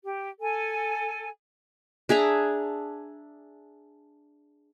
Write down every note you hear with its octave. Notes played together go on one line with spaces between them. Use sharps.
G4
A4 G#5
D4 G#4 E5 A#5